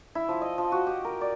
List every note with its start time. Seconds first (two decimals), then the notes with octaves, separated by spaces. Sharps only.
0.15 E4
0.28 F3
0.41 D#5
0.58 F3
0.72 F#4
0.87 G4
1.05 A#4
1.21 D5